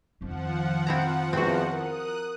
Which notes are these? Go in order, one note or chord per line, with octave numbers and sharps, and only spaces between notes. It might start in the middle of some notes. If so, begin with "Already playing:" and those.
F2 D#3 F3 F#5
C4 E4 A#5
E2 C4 F#4
A#4 D#6 F#6